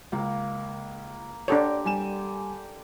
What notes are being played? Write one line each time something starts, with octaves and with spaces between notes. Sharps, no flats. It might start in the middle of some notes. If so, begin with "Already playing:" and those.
C#2 A#3
D3 D4 G4 A4 C#5 A#5
G3 G#5 E7